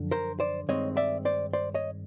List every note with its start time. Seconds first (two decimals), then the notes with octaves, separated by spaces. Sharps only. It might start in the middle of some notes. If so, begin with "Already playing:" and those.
Already playing: F#2 D3 F3
0.11 A#4 C5
0.40 C5 D5
0.69 G2 D#3 G#3 C4 C#5 D#5
0.97 D5 E5
1.25 C5 D5
1.53 C5 D5
1.74 C#5 D#5